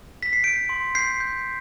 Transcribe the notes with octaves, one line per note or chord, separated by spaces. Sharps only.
B6
C7
G6 D7
C6
G6 C7
G6